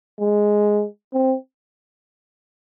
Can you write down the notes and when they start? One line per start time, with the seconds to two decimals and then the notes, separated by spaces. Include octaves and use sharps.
0.20 G#3
1.13 C4